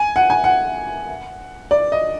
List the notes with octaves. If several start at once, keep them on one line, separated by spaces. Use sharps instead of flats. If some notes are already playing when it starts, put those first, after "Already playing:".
Already playing: G#5
F#5
G#5
F#5
D5
D#5